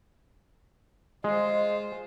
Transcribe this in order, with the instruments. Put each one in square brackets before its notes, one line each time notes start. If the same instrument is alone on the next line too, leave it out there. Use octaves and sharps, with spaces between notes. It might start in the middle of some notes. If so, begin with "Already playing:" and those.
[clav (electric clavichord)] G#3 [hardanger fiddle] F4 C5 [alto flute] D#5